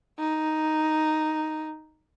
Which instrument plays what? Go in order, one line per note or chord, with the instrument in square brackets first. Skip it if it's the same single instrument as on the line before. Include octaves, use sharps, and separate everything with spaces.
[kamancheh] D#4